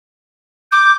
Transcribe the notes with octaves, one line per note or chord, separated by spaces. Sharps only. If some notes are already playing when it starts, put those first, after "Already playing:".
D6 G6